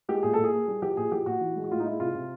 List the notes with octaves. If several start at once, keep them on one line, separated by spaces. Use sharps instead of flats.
G#3 G4
A#2 G#4
A4
A#2
G#4
A#3
G3
F3 G4
A#2 G#4
F3 G4
A#2 F#4
E3
G#3
F#4
A2 F4
D#4
G#3 E4
C3 F4
C3